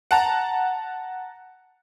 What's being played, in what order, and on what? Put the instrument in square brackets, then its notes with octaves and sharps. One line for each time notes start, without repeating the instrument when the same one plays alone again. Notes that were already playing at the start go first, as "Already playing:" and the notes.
[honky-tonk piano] F#5 A5 A#5